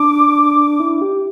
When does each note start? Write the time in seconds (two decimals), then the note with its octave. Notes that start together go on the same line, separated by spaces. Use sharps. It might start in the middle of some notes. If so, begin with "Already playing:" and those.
Already playing: D4 D6
0.80 E4
1.02 G4